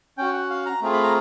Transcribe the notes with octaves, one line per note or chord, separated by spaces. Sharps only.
C#4 F#4 G5
F#5
F5
A#5
A3 C4 F4 G#4
B5
A#5